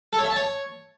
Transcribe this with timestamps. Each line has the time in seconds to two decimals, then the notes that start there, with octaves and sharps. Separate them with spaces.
0.13 A4
0.19 C#5
0.24 E5
0.30 A5
0.36 C#5